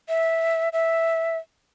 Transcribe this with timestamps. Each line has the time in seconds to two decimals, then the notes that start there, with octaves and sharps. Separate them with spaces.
0.09 E5
0.73 E5